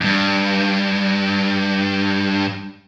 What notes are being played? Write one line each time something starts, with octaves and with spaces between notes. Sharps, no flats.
E2 G2